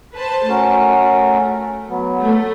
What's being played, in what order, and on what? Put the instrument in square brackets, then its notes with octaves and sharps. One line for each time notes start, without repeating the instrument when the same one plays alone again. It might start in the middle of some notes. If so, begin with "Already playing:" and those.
[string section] B4 C5 A5
[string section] A3 [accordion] C#4 F#4 A#4
[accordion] F#3 B3
[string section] A3